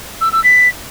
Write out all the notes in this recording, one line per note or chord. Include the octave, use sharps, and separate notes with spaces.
E6
E6
B6